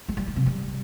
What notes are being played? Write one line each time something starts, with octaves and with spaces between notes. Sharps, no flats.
G#3
G3
D#3
C3
G3